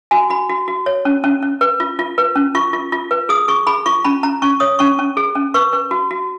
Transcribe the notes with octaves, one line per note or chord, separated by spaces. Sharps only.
F#4 G#5
F#4 B5
F#4
F#4
C#5
C#4
C#4
C#4
B4
F4
F4
B4
C#4
F4 C#6
F4
F4
B4
G#4 D#6
G#4 C#6
G#4 B5
F4 C#6
C#4 B5
C#4 A#5
C#4 C#6
C#5 D#6
C#4 C#6
C#4
G#4
C#4
B4 C#6
B4
F#4
F#4